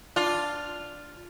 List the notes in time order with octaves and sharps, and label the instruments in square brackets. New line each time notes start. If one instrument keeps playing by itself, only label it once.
[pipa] D4 [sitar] F4